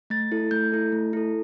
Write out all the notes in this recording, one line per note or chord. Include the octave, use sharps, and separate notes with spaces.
A3 A6
E4 A4
A3 G6
E4 A4
A3
E4 A4